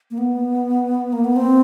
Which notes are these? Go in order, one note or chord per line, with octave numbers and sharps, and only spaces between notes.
A#3
B3
A#3
B3
C4